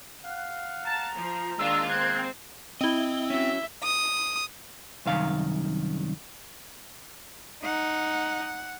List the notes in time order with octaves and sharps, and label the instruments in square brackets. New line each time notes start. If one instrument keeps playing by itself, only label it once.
[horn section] F5 F#5
[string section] A5 [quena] A#5
[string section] F3
[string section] D#3 D4 F4 [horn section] G#3 A#3 [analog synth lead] E6
[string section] C4 [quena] F#6 [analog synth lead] G#6
[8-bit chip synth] C4 [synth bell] E4 G7 [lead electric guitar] D#5
[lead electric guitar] C#4 F#4 [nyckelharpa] E5
[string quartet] D#6
[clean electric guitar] C2 F#2 D#3 F5
[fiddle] D#4 [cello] F#5